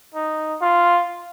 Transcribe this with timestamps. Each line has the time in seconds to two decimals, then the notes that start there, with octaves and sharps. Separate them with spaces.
0.14 D#4
0.62 F4